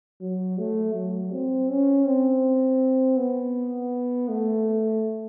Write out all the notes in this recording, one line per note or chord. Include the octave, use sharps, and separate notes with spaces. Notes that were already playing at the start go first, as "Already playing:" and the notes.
F#3
A3
F#3
C4
C#4
C4
B3
A3